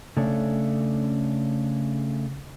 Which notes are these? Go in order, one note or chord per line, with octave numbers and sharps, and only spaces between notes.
C#3 A3 C#4 D4